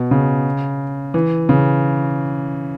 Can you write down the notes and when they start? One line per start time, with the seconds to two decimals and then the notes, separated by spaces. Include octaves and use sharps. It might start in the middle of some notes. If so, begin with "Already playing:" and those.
Already playing: B2
0.11 C#3
1.14 E3
1.49 C#3